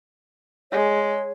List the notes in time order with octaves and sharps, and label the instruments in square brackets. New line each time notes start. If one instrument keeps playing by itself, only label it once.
[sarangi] G#3 [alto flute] C#5